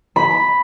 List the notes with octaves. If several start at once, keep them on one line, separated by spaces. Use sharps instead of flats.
B5